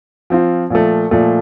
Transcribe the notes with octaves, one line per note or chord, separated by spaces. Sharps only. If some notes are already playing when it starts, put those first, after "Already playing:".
F3 C4 F4
A#2 F3 A3
A#2 F3 A3